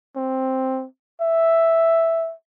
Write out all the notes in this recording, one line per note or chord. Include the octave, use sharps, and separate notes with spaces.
C4
E5